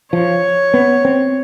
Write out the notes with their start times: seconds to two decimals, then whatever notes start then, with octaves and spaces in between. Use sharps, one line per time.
0.13 F3 C#5
0.74 B3
1.05 C4